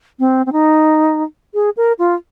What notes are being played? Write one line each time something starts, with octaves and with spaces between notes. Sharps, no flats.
C4
C4
D#4
G#4
A#4
F4